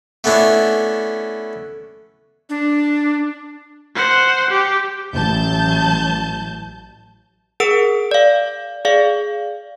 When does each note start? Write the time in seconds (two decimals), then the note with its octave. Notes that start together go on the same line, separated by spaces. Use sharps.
0.24 A3 B3 C#4 D4 E4
2.50 D4
3.95 C5 F#5
4.50 G4
5.13 A1 F#3 A5 G6
7.60 G#4 A#4 F#5 E6 D7
8.11 D5 F5
8.85 G#4 D5 F5